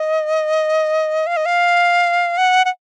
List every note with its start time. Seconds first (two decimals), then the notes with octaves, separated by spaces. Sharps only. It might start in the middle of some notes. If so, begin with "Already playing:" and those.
Already playing: D#5
1.27 F5
1.37 D#5
1.46 F5
2.38 F#5
2.65 F#5